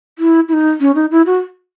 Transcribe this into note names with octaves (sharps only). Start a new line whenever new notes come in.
E4
E4
D#4
C#4
D#4
E4
F#4